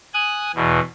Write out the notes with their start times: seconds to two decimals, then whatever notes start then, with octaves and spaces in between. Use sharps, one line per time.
0.14 G#5 D#6 F#6
0.55 E2 B2